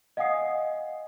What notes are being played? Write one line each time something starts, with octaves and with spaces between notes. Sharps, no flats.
D#5 F5 F#5 G#5 D#6 C7